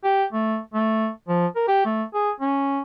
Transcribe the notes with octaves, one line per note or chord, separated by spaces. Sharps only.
G4
A3
A3
F3
A#4
G4
A3
G#4
C#4